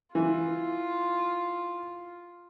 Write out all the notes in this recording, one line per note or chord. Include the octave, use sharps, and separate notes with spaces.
E3 F4